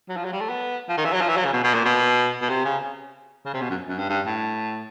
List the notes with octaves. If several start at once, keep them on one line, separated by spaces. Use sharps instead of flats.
F#3
F3
F#3
G3
A3
B3
F3
D#3
E3
F#3
F3
E3
F#3
C#3
B2
B2
A#2
B2
B2
C3
C#3
C#3
C3
B2
F#2
F#2
G2
G2
A2